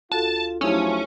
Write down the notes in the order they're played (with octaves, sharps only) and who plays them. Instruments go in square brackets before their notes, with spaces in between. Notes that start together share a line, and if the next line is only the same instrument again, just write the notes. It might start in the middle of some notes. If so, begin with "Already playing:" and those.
[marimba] D2 F#4 A4 [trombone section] F4 [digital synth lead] A5
[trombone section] F3 F#3 A3 [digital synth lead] C#4 [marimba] D#4 E4 G4